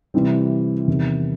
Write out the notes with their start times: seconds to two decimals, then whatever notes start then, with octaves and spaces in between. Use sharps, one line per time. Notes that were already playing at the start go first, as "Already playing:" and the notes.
0.14 C3 E3 G3 C4
0.88 E2 C3 D#3